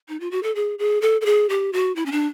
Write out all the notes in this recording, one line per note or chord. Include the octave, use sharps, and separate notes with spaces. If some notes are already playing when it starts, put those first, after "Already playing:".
D#4
F4
F#4
A4
G#4
G#4
A4
A4
G#4
G4
F#4
E4
C#4
D4